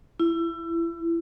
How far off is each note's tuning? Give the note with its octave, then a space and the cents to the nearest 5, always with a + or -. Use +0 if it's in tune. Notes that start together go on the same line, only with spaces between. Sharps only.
E4 +30